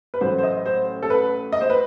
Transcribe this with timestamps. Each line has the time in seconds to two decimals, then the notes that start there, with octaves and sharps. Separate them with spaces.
0.14 B4
0.21 A1 A2 F#3 C5
0.38 C5
0.43 D#5
0.66 C5
1.02 A4
1.10 B4
1.52 D#5
1.61 C5
1.70 B4